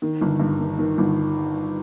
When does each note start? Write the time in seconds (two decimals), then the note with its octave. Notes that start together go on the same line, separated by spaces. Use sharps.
0.02 D#3
0.21 G1
0.40 G2
0.59 D#3
0.78 D#3
0.98 G1